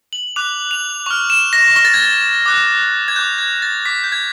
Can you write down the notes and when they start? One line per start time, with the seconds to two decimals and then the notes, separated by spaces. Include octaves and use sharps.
0.13 F#7
0.36 D6 F#6 F7
0.71 F7
1.06 C#6 F6 F7
1.30 E7
1.53 A#6
1.76 C#6 F6 A#6
1.85 A6
1.94 G#6
2.02 A6
2.46 D6 F#6
3.08 G#6
3.16 D6 F#6 G6
3.38 G#6
3.62 A6
3.86 D6 G6 B6
4.04 G6
4.12 G#6